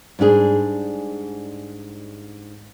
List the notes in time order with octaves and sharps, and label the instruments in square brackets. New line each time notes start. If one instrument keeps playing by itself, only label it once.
[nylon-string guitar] G#2 G3 D4 G#4